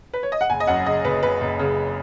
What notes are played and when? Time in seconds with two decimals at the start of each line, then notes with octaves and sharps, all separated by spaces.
0.14 B4
0.23 C#5
0.32 D#5
0.41 F#5
0.50 F#1 G#5
0.60 D#5
0.67 F#2 F#5
0.86 C#3 D#5
1.04 F#1 B4
1.23 F#1 B4
1.41 F#1
1.59 C#3